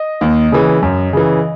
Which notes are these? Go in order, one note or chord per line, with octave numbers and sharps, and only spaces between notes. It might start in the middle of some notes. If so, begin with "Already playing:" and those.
Already playing: D#5
D#2
C#3 E3
F#2
C#3 E3